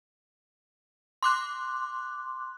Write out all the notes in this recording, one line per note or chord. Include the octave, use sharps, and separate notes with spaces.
C6 D6 F#6